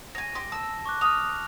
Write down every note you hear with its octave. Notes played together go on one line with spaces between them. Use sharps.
C#5 G#5 A#6
G4 C6
A5 E6
C#6 D6 F#6
D#6 F6 F7